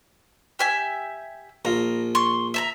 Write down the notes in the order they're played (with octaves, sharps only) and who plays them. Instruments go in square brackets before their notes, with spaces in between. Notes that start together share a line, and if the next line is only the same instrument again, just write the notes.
[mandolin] G4 E5 G#5
[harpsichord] A#1 F4 [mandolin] A#5
[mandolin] C6 C#6
E5 A5 A#5